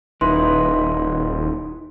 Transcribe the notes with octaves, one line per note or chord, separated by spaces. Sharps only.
D#1 D#4 E4 B4 C6